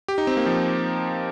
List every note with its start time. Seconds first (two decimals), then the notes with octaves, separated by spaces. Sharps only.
0.08 G4
0.18 D#4
0.27 C4
0.37 A#3
0.46 F3